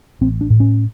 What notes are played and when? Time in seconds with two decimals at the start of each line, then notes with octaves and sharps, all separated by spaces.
0.21 A1 C4
0.41 D4
0.50 A2
0.60 C#4